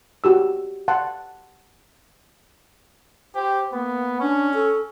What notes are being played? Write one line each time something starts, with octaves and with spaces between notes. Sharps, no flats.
F#4 G4 E6
F#5 A5 C6
G4 C5
A#3 B3
C#4 D4
A4